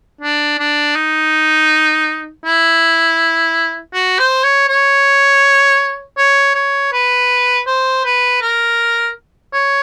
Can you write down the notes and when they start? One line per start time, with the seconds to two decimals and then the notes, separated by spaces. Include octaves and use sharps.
0.21 D4
0.59 D4
0.95 D#4
2.45 E4
3.94 F#4
4.19 C5
4.44 C#5
4.68 C#5
6.18 C#5
6.55 C#5
6.93 B4
7.67 C5
8.05 B4
8.42 A#4
9.53 C#5